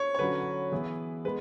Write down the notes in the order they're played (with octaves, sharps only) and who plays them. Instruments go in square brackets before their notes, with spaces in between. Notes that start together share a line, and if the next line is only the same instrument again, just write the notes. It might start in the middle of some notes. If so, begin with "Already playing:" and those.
Already playing: [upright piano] C#5
C#5
[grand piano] D3 F#3 C#4 F#4 [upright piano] B4
[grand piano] E3 B3 E4 G#4
[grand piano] G#3 B3 [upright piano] B4